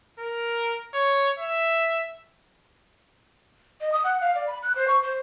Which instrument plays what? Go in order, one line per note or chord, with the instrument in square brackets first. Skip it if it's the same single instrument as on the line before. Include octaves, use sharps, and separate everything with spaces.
[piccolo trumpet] A#4
C#5
E5
[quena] D#5
D#6
F#5
F5
D5
B5
F#6
C5
C#6
C5